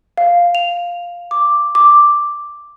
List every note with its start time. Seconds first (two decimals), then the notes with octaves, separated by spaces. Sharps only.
0.18 F5
0.55 F7
1.31 D6
1.75 D6